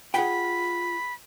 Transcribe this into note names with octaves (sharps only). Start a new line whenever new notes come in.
F4 G#4 F#5 G5 B5